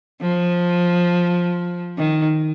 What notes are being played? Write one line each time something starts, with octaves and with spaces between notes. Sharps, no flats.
F3
D#3